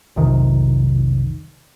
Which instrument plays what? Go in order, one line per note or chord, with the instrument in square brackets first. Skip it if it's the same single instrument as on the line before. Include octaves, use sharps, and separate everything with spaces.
[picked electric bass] F1 B1 C3 D#3